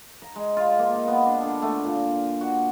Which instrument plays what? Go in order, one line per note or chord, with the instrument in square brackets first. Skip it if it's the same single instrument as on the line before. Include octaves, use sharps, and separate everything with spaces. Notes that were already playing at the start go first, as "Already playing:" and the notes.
[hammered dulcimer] A#5
G#3
F4
A#3
D#4
B3
D4
D3
A3
A#2
F#4